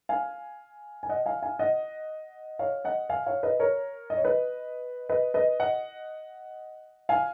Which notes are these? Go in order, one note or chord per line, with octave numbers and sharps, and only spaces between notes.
F5 G#5
G#5
D#5 F#5
F5 G#5
F5 G#5
D#5 F#5
C#5 F5
D#5 F#5
F5 G#5
C#5 F5
B4 D#5
A#4 C#5
D#5
C#5
B4 D#5
B4 D#5
B4 D#5
D#5 F#5
F5 G#5